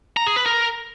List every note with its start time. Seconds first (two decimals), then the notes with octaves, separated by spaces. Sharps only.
0.17 A#5
0.27 G#4
0.36 B4
0.46 A#4